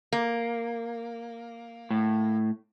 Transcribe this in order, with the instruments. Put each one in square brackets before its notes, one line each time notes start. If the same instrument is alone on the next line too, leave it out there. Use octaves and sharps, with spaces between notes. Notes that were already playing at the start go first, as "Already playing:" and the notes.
[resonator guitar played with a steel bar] A#3
[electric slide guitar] A2